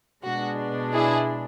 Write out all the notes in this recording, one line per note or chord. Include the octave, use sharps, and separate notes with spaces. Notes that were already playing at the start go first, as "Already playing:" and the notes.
B2 G#3 D4 F#4
E4 G#4